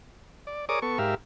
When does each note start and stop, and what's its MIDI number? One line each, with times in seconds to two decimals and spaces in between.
0.47 0.65 74
0.69 0.80 68
0.69 0.80 70
0.69 0.80 73
0.69 0.80 74
0.69 0.80 86
0.69 0.80 87
0.82 0.98 59
0.82 0.98 69
0.82 0.98 85
0.98 1.15 44
0.98 1.15 67
0.98 1.15 70
0.98 1.15 76
0.98 1.15 77